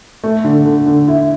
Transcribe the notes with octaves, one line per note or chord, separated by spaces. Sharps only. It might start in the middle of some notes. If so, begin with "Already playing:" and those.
A3
D3
D3
D3
E4